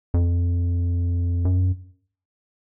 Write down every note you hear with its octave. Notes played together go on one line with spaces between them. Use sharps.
F2
F#2